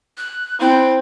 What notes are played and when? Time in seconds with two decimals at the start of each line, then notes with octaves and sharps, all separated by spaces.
0.17 F#6
0.60 C4 E4